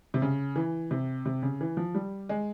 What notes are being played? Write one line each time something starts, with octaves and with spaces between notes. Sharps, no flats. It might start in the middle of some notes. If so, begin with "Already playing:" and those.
C3
C#3
E3
C3
C3
C#3
E3
F3
G3
G#3